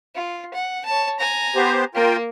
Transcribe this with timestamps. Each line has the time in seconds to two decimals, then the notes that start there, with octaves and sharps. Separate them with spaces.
0.15 F4
0.54 F#5
0.86 C#5 A5
1.20 G#5 A#5
1.56 B3 G4 C5
1.95 A#3 F4 A#4 G5